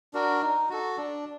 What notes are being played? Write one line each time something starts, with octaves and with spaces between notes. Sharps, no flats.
D4 F#4 A#4
D#4
F#4 A4
D4